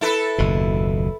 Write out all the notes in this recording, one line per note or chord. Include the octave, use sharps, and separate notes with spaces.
E4 A4 B4
F#1 D#2 B2